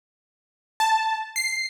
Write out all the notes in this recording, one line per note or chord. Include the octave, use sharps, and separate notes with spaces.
A5
C7